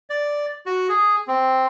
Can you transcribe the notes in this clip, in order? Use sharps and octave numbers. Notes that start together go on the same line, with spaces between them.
D5
F#4
G#4
C4